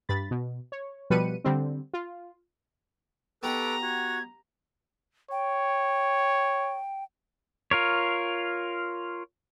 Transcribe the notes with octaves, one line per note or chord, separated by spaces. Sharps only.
G2 B5 A6
B2
C#5
B2 F3 G3 B4 C#7 D#7
D3 G3 C4
F4
B3 D#4 G4 A4 B4 A#5 C#6 D6
F#4 G#6
C#5 G5
F4 A#4 C#5